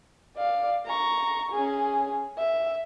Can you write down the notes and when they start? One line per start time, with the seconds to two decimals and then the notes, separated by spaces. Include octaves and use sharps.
0.37 D5 F5
0.86 A#5 C#6
1.52 C#4 G#4
2.38 E5